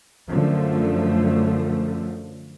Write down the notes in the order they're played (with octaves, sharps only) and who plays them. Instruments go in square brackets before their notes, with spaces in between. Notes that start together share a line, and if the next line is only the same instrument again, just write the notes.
[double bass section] F#2 D3 F3 A3